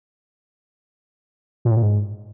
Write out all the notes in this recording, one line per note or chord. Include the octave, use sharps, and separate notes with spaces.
A#2
A2
A#2
G#2